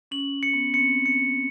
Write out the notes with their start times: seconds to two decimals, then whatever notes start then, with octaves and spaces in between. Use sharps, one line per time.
0.11 C#4 F#7
0.43 C#7
0.54 B3
0.74 C4 C#7
1.06 C#7